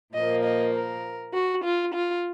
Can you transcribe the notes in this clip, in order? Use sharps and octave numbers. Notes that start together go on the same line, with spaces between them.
A#2 F3 A#3 D#5
D#5
A#4
F#4
F4
F4